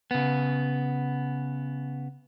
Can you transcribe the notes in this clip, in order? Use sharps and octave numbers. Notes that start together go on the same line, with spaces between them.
C#3 B3